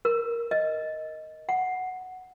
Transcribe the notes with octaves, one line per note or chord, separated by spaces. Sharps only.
A#4
D#5
F#5